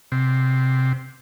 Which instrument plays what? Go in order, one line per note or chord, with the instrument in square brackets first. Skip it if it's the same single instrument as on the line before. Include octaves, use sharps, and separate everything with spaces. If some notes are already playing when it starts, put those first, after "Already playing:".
[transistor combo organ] C3